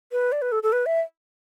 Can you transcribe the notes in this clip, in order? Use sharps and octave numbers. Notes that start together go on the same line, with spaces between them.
B4
D5
B4
A4
A4
B4
E5